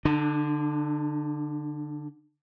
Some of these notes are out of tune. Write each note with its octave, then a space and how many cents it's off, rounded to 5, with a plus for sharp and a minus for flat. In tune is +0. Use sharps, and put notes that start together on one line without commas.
D3 +0 D4 +45